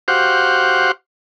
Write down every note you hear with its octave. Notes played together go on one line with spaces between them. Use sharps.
F#4 G4 C5 F5 F#5